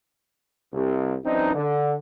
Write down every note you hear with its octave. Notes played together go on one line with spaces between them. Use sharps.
C2
F#2 E3 C4 D4 D#4
D3